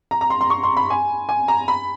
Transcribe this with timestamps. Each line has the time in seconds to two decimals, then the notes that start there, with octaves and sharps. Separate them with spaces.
0.11 A#5
0.21 A#5
0.30 C6
0.41 C6
0.50 C#6
0.63 C6
0.77 B5
0.90 G#5
1.29 G#5
1.48 A#5
1.68 B5